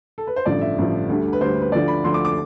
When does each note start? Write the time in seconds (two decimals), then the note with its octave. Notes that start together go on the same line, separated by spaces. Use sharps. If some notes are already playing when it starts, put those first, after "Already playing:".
0.18 A4
0.27 B4
0.36 C5
0.46 A1 G2 D3 F3 D5
0.61 E5
0.78 A1 G2 D3 F3
1.09 D2 D3 G3
1.33 B4
1.41 D2 D3 G3 C5
1.62 B4
1.72 D2 D3 F3 D5
1.88 B5
2.04 D2 D3 F3 C6
2.14 D6
2.25 D6